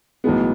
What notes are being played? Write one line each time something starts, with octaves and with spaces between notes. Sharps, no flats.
B1 A2 E3 G#3 B3